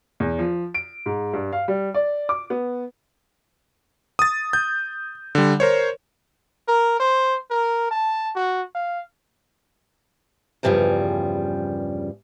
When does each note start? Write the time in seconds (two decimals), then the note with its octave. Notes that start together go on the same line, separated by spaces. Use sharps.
0.20 E2
0.39 F3
0.75 D7
1.06 G#2
1.33 G2
1.53 F5
1.68 G3
1.94 D5
2.29 D6
2.50 B3
4.19 D#6 A6
4.53 G6
5.35 D3 G3
5.60 A#4 C5 C#5
6.68 A#4
7.00 C5
7.51 A#4
7.91 A5
8.36 F#4
8.75 F5
10.63 E2 G2 C#3 F3 G3